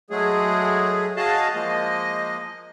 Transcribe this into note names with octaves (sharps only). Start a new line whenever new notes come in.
F#3 G#3 A3 G#4
F#4 G#4 D#5 F5 A5
F3 G#3 A#3 D#5